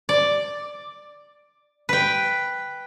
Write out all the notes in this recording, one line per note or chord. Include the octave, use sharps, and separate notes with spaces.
D5
B4 G5